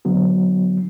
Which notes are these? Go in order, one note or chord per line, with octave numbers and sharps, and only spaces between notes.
D3 F#3 B3